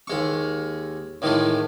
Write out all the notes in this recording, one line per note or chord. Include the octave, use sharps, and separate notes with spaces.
D#2 G#3 C#6
A2 D#3 E3 G#3 A3